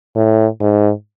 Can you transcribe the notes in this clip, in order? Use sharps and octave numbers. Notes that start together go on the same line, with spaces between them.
A2
G#2